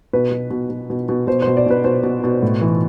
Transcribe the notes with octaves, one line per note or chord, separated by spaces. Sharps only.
B2 B4
B2
B2
B2
B2
B2
B2 C5
B2 C5
D5
B2 B4
B2 C5
B2
B2
A2
E3